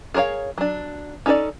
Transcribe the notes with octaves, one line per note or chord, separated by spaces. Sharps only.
G#4 A#4 C5 C#5 F5
F#3 D4
C#4 D#4 A4 C#5 D5